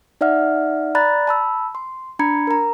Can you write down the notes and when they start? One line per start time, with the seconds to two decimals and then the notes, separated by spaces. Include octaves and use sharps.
0.21 D#4 D5 E5 F#5 F6
0.95 D5 A#5 B5 F#6 A6
1.27 A5 B5 E6
1.75 C6
2.19 D4 A#5 B5 G#6 C#7
2.47 A#4 A#5